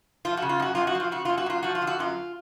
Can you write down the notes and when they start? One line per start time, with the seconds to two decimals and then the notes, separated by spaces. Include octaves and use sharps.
0.25 F3 F4
0.37 C#3 F#4
0.49 F4
0.60 F#2 F#4
0.75 F#2 F4
0.87 F#4
0.95 F3
1.00 F4
1.11 C#3 F#4
1.25 F#2 F4
1.38 F#4
1.46 F#2 F4
1.63 F3 F#4
1.75 F4
1.82 D3
1.87 F#4
1.99 F#2 F4